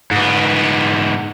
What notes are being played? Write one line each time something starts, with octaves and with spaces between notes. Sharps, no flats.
G#2 B3